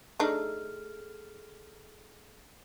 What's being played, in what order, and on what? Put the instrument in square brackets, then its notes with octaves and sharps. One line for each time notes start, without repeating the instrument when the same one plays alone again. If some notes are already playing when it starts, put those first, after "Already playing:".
[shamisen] A3 D4 D#4 [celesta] G#4 A4 F6